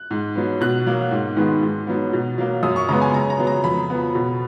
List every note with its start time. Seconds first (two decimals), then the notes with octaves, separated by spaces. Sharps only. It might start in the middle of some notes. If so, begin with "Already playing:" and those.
Already playing: F#6
0.11 G#2
0.35 F#3 B3
0.61 B2 F#6
0.87 F#3 A#3
1.11 G#2
1.37 D#3 G#3 B3
1.63 G#2
1.87 F#3 B3
2.13 B2
2.38 F#3 A#3
2.63 F#2 D#6
2.76 C#6
2.89 C#3 G#3 B3 A#5
3.02 G#5
3.13 C#3 A#5
3.30 A#5
3.39 F#3 B3
3.47 A#5
3.64 F2 B5
3.90 F3 B3
4.15 B2